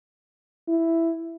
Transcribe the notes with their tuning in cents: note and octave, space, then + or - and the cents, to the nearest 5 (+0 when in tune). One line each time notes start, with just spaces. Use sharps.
E4 +5